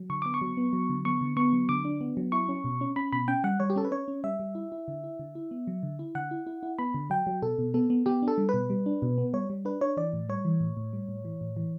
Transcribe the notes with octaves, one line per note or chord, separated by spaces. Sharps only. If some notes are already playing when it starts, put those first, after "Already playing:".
Already playing: F#3
D3 C#6
B3 D6
C#6
F#3
B3
F#3
D3
B3 C#6
D3
B3 C#6
F#3
D3 D6
D4
B3
F#3
E4 C#6
C#4
B2
C#4
C#4 B5
B2 B5
C#4 G5
G3 F#5
G3 C#5
G4
C#4 A4
B4
C#4 C#5
C#4
G3 E5
G3
E4
E4
D3
E4
D3
E4
B3
F#3
D3
E4
D3 F#5
E4
E4
E4
B3 B5
D3
F#3 G5
F#3
B2 A4
B2
B3 A4
B3
B3 G4
D4
A4
G3
B2 B4
G3
D4
B2
B3
G3 C#5
G3
D4 B4
D4 C#5
E3 D5
A2
G3 C#5
E3
A2
A2
G3
A2
E3
A2
E3